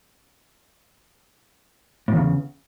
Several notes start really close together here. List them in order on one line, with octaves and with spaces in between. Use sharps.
A2 E2 C#3